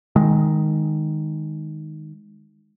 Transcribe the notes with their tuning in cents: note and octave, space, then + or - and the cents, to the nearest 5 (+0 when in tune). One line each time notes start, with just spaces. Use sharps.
D#3 +0 G#3 -5